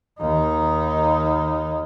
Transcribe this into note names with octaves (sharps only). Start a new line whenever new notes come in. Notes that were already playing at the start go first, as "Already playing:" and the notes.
D#2 D#4